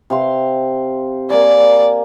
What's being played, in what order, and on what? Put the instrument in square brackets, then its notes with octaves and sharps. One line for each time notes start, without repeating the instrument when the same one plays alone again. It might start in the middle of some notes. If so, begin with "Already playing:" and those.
[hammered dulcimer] C3 F5 C6
[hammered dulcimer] A#3 G#5 [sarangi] D5